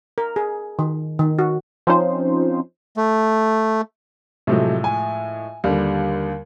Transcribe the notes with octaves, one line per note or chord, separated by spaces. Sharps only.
A#4
G#4
D#3
D#3
F#4
F3 C4 C#4 D#4 F4 C5
A3
A2 C3 F3 F#3 G#3 A3
G#5
D#2 D3 G3